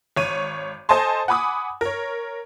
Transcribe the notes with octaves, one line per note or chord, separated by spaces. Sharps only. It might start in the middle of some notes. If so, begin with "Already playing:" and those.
G#1 C#5 D#7
A4 C5 D#5 G#5 A5 C6
F#5 G#5 B5 D6 D#6
A#4 C#5